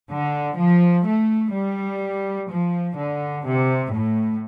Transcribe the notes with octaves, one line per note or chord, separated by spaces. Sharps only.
D3
F3
A3
G3
F3
D3
C3
A2